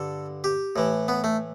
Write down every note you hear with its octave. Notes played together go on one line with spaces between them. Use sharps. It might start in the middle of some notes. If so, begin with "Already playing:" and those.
Already playing: G2 D3 A4
G4
A2 E3
B3
A3